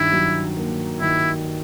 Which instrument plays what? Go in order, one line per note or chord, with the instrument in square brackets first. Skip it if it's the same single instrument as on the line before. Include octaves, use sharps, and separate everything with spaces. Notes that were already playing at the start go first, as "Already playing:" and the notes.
Already playing: [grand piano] G2 D#3 [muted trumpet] E4
[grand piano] F#3
A#3
[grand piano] D#3 [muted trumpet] E4